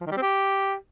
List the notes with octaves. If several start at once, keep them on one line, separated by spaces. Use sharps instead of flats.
F3
D#3
G3
C4
G4